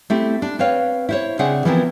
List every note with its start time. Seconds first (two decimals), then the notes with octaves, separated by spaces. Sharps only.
0.10 A3 C4 E4 G4
0.42 D4
0.59 C4 B4 C#5 F5
1.09 E4 C5 C#5
1.39 C#3 C4 D4 G#4 E5 F#5
1.65 E3 F3 B3 C4 E4 A#4